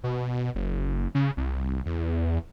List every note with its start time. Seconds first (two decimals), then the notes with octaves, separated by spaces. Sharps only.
0.04 B2
0.55 F#1
1.15 C#3
1.37 C2
1.86 E2